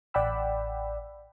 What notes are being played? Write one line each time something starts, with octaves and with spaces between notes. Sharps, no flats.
A1 D5 F#5 G5 B5 E6